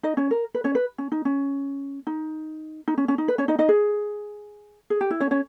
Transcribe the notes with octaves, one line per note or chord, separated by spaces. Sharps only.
D#4 D#5
C#4 C#5
A#4
B4
C#4 C#5
B4
C#4
D#4
C#4
D#4
D#4
C#4
C#4
D#4
B4
C#4 C#5
D#4 D#5
D#4 D#5
G#4
G#4
G4
E4
C#4 C#5
C#4 C#5